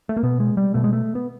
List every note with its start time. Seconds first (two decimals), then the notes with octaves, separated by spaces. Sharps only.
0.09 A3
0.17 A#3
0.23 B2 B3
0.40 G#3
0.57 G3
0.74 B2 A3
0.84 G#3
0.93 A3
1.15 B3